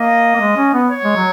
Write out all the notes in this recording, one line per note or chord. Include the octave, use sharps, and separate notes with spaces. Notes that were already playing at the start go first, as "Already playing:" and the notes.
Already playing: A#3 D#5
A#3
G#3
C#4
B3
C#5
G#3
F#3